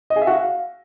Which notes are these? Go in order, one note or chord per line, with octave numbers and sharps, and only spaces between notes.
D#5
G#4
E5
F#4
F5